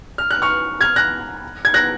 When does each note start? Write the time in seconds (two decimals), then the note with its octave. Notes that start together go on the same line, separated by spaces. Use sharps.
0.18 F6
0.31 F#6
0.42 C#6 F6
0.81 F6 G#6
0.96 F#6 A#6
1.65 G#6
1.74 F#6 A#6